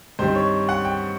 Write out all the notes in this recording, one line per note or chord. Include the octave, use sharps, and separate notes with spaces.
G2 D#3 G3 C4 C5
C#5
F#5
G5